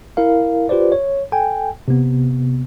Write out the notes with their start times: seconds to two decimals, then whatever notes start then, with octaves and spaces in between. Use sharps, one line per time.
0.17 E4 A#4 F5
0.69 F4 G4 B4 C5 D5
0.92 C#5
1.32 A4 G5 G#5
1.88 C3 B3